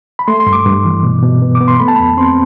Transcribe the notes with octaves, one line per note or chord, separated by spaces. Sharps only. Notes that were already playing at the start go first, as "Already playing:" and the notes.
B5
A3 C6
C6
G2
D6
G2
E3
B2
B2
B3
D6
B3
C6
A3 B5
A5
F2 B5
C4 C6